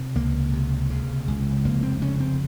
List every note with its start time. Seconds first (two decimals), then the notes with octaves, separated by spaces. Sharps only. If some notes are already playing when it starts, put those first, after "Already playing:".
Already playing: C3
0.15 C#2 A#3
0.53 C3
0.90 C#3
1.28 C#2
1.65 F1 A#3
1.83 C4
2.01 C#3 C#4
2.20 C4